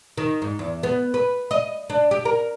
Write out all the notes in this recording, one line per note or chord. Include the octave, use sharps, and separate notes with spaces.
D#3
G#2
E2
B3
B4
D#5
D4
G4
A#4